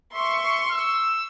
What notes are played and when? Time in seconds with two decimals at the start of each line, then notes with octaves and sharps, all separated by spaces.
0.15 E5 C6 C#6
0.71 E6